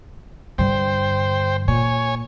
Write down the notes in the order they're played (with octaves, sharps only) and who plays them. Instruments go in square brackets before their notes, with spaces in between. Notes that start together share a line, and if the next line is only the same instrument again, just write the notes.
[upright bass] G2 D3 [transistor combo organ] C5 G5
[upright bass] A#2 [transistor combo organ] C#5 G#5